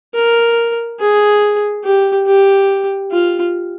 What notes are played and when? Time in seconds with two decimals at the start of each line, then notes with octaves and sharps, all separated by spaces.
0.15 A#4
1.00 G#4
1.84 G4
2.27 G4
3.11 F4